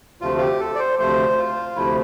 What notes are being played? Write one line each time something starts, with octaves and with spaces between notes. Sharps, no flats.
D2 C3 F3 A3 F4
F4
G4
A4
D5
C5
D2 C3 F3 A3 C5
F4
D2 C3 F3 A3 E4